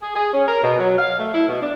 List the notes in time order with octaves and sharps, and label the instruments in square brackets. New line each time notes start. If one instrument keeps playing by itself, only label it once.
[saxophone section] G#4
G#4
C#4
A#4
B2
F#3
F5
A3
E4
B2
D4